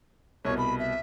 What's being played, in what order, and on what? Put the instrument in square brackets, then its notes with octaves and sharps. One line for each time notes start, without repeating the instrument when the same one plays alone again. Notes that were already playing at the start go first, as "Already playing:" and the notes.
[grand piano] C2 B2 [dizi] C#5
[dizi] B5
E5